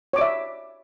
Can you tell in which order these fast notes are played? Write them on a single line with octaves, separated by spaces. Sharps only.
C#5 D6 D5 E5